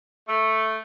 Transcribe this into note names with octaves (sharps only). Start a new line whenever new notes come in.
A3